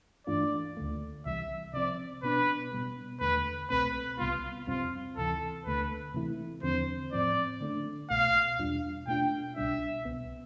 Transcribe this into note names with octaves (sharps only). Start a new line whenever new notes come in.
G2 E3 A3 D4 F4 D5
D2 D3 A3
C2 C3 E3 G3 E5
C3 F3 C4 D5
B2 B3 D4 B4
B2 G3 B3
E2 D3 A3 B4
C2 B2 A3 C4 B4
C2 C3 G3 B3 F4
F2 C3 G3 C4 F4
D2 C3 E3 A4
D2 D3 A3 B4
C3 E3 A3 E4
E2 D3 F3 C4 C5
A2 F3 C4 D5
D3 A3 D4
C2 B2 A3 F5
E2 B2 G3 D4 F4
B2 A3 D4 F4 G5
C2 B2 G3 D4 E5
C2 B2 B3